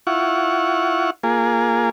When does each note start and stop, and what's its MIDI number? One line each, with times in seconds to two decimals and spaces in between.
0.07 1.10 64
0.07 1.10 65
0.07 1.10 78
0.07 1.10 85
1.23 1.89 58
1.23 1.89 65
1.23 1.89 68